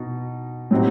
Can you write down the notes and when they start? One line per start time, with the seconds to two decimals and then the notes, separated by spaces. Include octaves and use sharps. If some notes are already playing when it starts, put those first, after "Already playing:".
Already playing: B2 D#4
0.71 A2 F#3 C4 D#4 G4